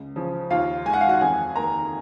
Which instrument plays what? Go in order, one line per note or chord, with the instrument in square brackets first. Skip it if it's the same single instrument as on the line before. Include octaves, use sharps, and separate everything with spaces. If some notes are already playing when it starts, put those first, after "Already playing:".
Already playing: [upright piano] C#2
C#3 F3
D#2 F4 F5
D#3 G#3 G#5
F#5
F5
F#4 F#5
F2 G#4 G#5
D#3 A#3 A#4 A#5